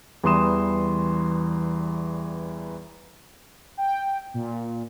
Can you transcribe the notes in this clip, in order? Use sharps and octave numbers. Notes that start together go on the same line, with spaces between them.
E2 E3 G3 C6 D#6 E7
G5
A#2